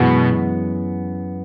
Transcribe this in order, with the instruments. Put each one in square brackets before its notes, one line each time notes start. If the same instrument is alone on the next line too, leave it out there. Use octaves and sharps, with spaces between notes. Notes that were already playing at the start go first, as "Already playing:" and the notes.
Already playing: [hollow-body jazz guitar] F#2 E3 G#3 B3 F#4 [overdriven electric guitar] B2